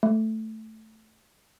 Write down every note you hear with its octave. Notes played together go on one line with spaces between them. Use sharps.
A3